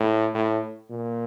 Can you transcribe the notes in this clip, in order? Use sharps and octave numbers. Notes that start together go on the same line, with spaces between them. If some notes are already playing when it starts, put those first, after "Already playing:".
Already playing: A2
A2
A#2